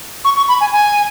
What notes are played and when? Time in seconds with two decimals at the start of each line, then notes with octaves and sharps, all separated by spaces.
0.25 C#6
0.37 C#6
0.49 B5
0.61 G#5
0.73 G#5